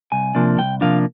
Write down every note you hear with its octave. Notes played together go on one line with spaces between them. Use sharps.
C2 G#5
C3 F3 A#3 D4
C2 G5
C3 F3 A#3 D4 F5